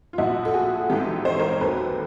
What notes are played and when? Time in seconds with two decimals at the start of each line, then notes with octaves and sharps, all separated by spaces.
0.13 F4
0.18 A#1 A#2 F3 E4 F#4
0.45 A4
0.54 F#4 G#4
0.90 A1 G#2 E3 G4 A4
1.25 C5
1.32 C#5
1.39 A#4 C5
1.61 D#2 D#3 F#3 A4 B4